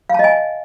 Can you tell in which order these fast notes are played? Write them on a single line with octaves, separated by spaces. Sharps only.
F5 A5 D#5 G#5